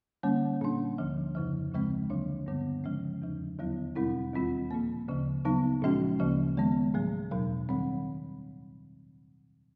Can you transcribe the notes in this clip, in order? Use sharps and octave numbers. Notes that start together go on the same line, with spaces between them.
D3 G3 A#3 C#4
A#2 G3 A#3 D4
D2 D3 F3
F2 C#3 F3
D2 C#3 F3 G#3 C4
D2 D3 F#3 A#3 D4
G2 D3 G3 B3
C#3 F3 G#3 C#4
E2 C#3 F3
D#2 D3 F#3 B3 E4
E2 B2 G3 C4 E4
D#2 D#3 G3 C4 F4
A#2 F3 A#3
D2 C#3 F3
C#3 F#3 B3 D#4
A#2 F3 G#3 C#4 F#4
D2 C#3 F3 A#3
D#3 G#3 B3
A2 F#3 A3
E2 B2 F#3
D#3 G3 C4